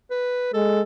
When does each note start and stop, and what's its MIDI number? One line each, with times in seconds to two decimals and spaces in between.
0.11 0.53 71
0.54 0.82 56
0.54 0.82 69